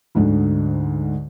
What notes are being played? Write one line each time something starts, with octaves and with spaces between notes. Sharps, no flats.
D2 G#2 D3